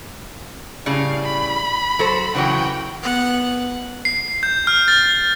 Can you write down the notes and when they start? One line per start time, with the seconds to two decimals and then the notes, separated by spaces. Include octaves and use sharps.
0.86 A2 C#3 G3 F5
1.23 B5
1.99 F#3 A4 C5
2.35 C#3 E3 F#3 F#5 G5
3.02 B3 F#5
4.05 C7
4.43 G6
4.67 F6
4.88 A6